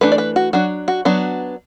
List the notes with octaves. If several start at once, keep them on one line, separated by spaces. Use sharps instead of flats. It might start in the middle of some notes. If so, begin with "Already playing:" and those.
E3 A3 D4 B4
D5
B4
F#4
F#3 D4 F#4
F#4
F#3 B3 D4 F#4